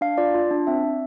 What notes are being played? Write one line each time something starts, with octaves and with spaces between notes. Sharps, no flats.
D4 F5
F4 D5
F4
D4
C4 E5
C4